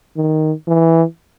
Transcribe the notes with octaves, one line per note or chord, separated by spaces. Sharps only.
D#3
E3